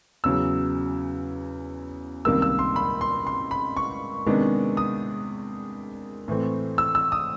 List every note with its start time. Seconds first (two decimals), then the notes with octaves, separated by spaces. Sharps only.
0.24 E2 C#3 F#3 E6
2.25 C#2 C3 D#3 G3 A#3 E6
2.42 E6
2.59 C6
2.76 B5
3.01 C6
3.27 C6
3.51 B5
3.77 C#6
4.26 C3 D#3 G#3 B3 D4
4.77 D#6
6.28 A2 E3 A3 C4
6.78 E6
6.95 E6
7.12 D#6